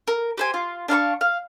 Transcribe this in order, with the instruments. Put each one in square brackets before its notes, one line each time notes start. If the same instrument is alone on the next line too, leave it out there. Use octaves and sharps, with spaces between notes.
[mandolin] A#4
G4 C5 G#5
F4
D4 F5 A5 C#6
F5